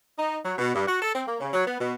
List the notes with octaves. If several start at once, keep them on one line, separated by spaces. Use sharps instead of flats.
D#4
F#3
B2
G2
F#4
A4
C4
A#3
C#3
F#3
B3
B2